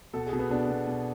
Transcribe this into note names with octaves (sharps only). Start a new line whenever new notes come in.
B2 A4
G#4
B2
B3
B2 D4
B2
B2